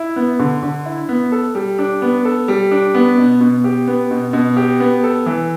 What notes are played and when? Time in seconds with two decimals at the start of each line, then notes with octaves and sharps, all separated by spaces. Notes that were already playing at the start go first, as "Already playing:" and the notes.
Already playing: E4
0.16 B3
0.39 D3
0.63 D3
0.85 E4
1.09 B3
1.32 A4
1.55 G3
1.79 D4
2.02 B3
2.25 A4
2.48 G3
2.71 D4
2.95 B3
3.18 B2
3.41 B2
3.64 G4
3.87 B3
4.11 B2
4.33 B2
4.57 G4
4.80 B3
5.03 A4
5.26 E3